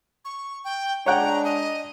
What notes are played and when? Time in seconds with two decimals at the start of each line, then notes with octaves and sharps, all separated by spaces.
0.25 C#6
0.64 G5
1.06 G#3 D4 C#5 F#5 G5 A#5
1.44 D#5